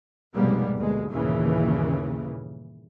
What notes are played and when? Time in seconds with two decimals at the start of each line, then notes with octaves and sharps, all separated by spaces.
0.34 F1 B1 G#2 G3 A#3 B3
0.75 D2 B2 G#3
1.10 G1 D#2 A#2 C#3 E3